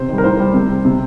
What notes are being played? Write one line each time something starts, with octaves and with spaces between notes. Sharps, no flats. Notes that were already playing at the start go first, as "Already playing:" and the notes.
Already playing: C3 C5
D#3 G3
A#4
A2 C5
G3
C3
G3
C3